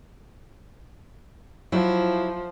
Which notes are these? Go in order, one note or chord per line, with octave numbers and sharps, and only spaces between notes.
F3 F#3 E4